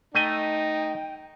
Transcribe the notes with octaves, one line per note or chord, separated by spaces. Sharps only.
A3 D#4 D#5 G5 G#5